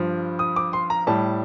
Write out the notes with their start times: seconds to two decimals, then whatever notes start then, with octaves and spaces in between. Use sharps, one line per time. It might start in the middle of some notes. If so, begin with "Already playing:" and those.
Already playing: G2 F3
0.39 D#6
0.56 D6
0.73 C6
0.90 A#5
1.07 A2 G3 A5